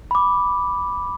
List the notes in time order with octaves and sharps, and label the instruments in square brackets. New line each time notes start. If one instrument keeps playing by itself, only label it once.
[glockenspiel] B5 D6